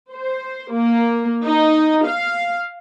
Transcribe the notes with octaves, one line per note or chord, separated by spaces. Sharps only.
C5
A#3
D#4
F5